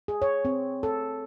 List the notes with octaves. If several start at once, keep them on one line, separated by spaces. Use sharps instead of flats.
G#4
C#5
C4
A4